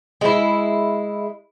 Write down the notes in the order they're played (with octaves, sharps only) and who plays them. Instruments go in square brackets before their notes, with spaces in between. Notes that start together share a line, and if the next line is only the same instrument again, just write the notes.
[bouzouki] G#3 E4